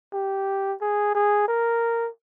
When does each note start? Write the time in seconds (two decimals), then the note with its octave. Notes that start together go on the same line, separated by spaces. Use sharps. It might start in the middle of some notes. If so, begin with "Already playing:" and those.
0.13 G4
0.81 G#4
1.15 G#4
1.48 A#4